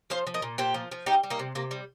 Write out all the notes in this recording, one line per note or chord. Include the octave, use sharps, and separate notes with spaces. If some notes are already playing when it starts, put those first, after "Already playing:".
F3 C5 F5
F3
A#4 D#5
A#2
A#2 G4 C5
F3
F3
G3 D#4 G4
G3
A#3 D#4
C3
C3 A#3
G3